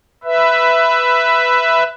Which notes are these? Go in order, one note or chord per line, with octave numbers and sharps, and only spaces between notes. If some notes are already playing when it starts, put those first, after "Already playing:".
B4 E5